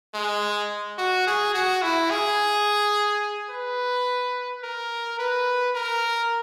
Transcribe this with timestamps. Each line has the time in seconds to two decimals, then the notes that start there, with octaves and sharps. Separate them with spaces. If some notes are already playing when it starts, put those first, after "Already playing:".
0.14 G#3
0.98 F#4
1.27 G#4
1.54 F#4
1.82 E4
2.10 G#4
3.50 B4
4.63 A#4
5.19 B4
5.75 A#4